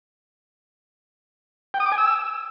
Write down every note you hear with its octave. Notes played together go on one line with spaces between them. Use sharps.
G5
D#6
D6
G#5
E6